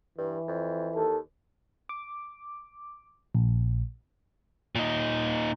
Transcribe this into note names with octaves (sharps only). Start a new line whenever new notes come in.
G2 E3
F2
D#2 A4
D6
A#1
A#2 D#4